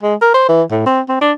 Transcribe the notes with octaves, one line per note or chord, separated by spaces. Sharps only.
G#3
A#4
C5
E3
A2
C4
C4
D4